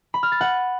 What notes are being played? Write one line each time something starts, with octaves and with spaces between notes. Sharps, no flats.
B5
F6
A6
F#5